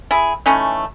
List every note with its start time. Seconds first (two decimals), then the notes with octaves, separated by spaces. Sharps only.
0.11 E4 G#4
0.46 E3 A3 C#4 D#4